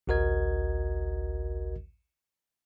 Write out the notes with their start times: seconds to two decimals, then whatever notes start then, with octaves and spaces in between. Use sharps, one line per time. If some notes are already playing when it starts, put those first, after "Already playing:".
0.07 A1 D2 F#4 A#4 D#5 G#6